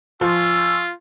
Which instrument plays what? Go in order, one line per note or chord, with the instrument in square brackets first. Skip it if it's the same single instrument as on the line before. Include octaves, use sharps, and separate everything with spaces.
[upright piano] F3 [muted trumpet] F4 [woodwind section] G#5 C#6 E6